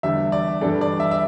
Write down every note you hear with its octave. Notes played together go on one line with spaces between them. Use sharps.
E2 D3 G3 D4 E5
D5
G2 E3 G3 D4 A4
D5
E5
E5